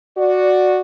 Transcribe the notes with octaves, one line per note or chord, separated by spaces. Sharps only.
F#4 D5